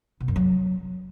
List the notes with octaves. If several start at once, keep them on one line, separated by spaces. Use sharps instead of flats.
B2
F#2
F#3